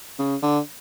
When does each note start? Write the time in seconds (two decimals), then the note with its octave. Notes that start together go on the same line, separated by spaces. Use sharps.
0.19 C#3
0.43 D3